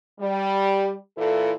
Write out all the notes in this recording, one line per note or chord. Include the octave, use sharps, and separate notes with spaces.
G3
A#2 E3 E4 A4